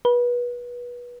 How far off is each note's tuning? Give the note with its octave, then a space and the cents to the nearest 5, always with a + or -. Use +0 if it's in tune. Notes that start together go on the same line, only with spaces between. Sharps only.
B4 -25